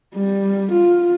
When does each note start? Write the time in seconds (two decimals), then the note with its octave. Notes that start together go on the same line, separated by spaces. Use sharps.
0.15 G3
0.72 F4